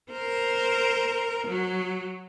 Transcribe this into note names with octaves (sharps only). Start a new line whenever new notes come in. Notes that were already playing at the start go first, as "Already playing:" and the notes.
A#4 C5
F#3